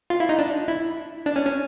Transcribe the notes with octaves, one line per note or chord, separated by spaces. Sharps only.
F4
E4
D#4
D4
E4
D4
C#4
C#4